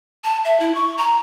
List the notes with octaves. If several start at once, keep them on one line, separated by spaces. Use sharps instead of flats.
A5
E5
E4
C#6
A#5